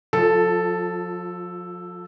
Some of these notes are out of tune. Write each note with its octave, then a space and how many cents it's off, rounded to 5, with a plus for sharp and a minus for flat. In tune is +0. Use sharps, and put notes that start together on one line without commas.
F3 +35 F4 +0 A4 +0